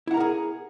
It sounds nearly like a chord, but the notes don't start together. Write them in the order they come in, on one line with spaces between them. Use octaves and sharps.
E4 F#5 A#5 A#4 G#4